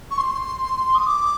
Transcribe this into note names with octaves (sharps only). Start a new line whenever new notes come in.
C#6
C6
D#6
D6